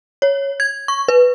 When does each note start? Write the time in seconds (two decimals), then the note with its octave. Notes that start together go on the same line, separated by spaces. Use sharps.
0.22 C#5
0.60 G#6
0.88 C#6
1.08 B4